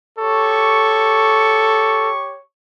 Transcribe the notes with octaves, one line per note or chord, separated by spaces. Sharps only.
G4 A4 C#5 C#6